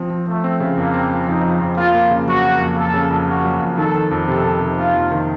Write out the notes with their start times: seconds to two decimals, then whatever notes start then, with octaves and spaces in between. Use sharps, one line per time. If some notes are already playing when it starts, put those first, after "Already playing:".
Already playing: F3 C4
0.10 F3
0.27 F3 A3
0.44 C4
0.60 C#3
0.77 F2 A#3
0.94 C4
1.11 F3
1.27 F2 D#4
1.44 F3
1.61 F2
1.77 A#3 F4
1.95 A#3
2.11 C#3
2.28 F#3 F#4
2.44 A#3
2.61 F2
2.77 A#3 A4
2.94 C#3
3.11 F2
3.27 A#3 F#4
3.45 F#3
3.61 F2
3.78 D#3 A4
3.94 D#3
4.11 F2
4.28 C3 A4
4.44 C3
4.61 C3
4.77 A#3 F4
4.94 F2
5.11 D#3